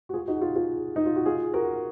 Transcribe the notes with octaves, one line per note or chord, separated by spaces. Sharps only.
F#4
F4 G#4
D#4 F#4
F4 G#4
F4 G#4
D#4
F4
F#4
F4 G#4
F#4 A#4